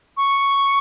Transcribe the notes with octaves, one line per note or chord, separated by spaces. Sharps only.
C#6